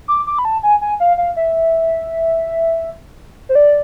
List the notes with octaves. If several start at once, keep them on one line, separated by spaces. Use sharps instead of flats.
D6
D6
B5
A5
G#5
G#5
F5
F5
E5
C5
D5